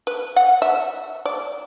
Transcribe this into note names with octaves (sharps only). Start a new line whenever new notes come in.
B4
F#5
E5
D5